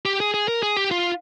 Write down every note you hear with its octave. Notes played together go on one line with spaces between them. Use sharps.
G4
G#4
G#4
A#4
G#4
G4
F4